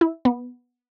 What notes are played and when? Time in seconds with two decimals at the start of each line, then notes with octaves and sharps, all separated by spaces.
0.01 E4
0.25 B3